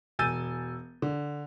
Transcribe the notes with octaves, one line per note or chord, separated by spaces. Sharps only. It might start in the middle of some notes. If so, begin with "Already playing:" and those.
E1 G#5 E6 G6 A6 D#7
D3